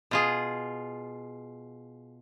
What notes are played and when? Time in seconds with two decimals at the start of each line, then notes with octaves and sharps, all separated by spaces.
0.11 B2 F4 G#4